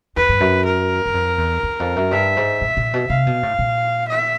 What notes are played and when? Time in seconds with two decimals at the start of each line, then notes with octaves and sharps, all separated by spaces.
0.16 E2 B4
0.29 G2
0.40 F#2
0.65 A#4
1.06 F#2
1.14 F2
1.38 E2
1.63 E2
1.80 F2
1.96 F#2
2.12 G2 E5
2.37 G#2
2.61 A#2
2.77 A#2
2.94 B2
3.10 C3 F5
3.27 B2
3.43 A2
3.59 A#2
4.08 E5